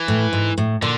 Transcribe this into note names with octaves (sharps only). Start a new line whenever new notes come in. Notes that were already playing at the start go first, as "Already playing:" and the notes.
Already playing: E3
A2
G#2
A2
A#2 D3